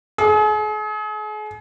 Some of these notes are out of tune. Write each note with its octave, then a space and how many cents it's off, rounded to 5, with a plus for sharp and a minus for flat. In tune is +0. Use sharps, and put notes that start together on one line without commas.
G#4 +40